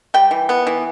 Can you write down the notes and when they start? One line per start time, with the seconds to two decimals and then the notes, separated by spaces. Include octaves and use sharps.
0.14 G3 G5
0.31 E3
0.49 B3
0.67 E3